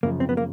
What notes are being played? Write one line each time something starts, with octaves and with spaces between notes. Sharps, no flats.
F#2 C#3 F3 A#3
C4
B3
A#3